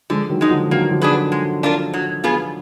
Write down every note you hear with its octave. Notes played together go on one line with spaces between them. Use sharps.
D3 F3 G#3
D#3 F#3
G#3 D#4
D3 F3
D#3 F#3 A#3
D3 F3
D4 G#4 B4
D3
G#3
D4 F4 A#4
F#3
B3 F4 G#4